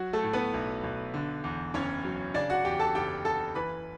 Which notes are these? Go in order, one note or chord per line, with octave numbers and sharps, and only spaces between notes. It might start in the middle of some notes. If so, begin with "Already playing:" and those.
Already playing: F#3 F#4
A3 A4
A2
B3 B4
B1
B1
D3
E2
F#1 C#4 C#5
F#3
C#3 D4 D5
F#4 F#5
E2 G4 G5
A4 A5
F#1 G4 G5
F#1 A4 A5
E3 B4 B5